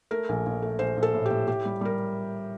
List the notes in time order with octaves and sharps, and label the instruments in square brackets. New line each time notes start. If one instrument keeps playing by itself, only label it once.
[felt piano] A3 A#4
A#1
A#1
A3
A#1 C5
A#1
A4
A2
G4
A2
A2 G4
G3
G3 A#4